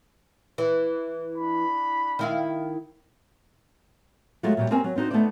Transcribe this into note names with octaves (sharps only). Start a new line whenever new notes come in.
E3
D4 B5
D#3 E4 F5
F#3 G#3 A3 F4 F#4
A#2 F#3 G3
A#3 C4 C#4 G4 A#4 G#5
F#3
C4 D4 D#4 F#4 C5
A3 B3 D#4 F4 C5 D5